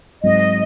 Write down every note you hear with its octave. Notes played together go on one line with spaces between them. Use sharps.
G#2 F#3 C4 D#5